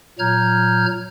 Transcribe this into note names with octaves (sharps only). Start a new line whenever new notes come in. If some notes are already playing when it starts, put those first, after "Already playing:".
A#2 F#3 A#5 F6 G6 G#6